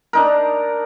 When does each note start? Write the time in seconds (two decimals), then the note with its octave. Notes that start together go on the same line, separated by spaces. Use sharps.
0.13 D4 D#4 A#4